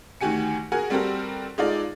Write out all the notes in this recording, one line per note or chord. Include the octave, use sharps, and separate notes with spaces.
D2 D#3 F#4 G4 G#5 C#7
F#4 G#4 A#4 F#5 G#5
G3 C4 F#4 G4 A4 A#4
G#3 D#4 F4 A4 D5